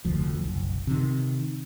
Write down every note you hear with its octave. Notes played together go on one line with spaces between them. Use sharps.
F1 D2 F3
F#1 B1
C3 D#3